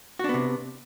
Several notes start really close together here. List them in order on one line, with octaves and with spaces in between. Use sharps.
F#4 D4 B3 C3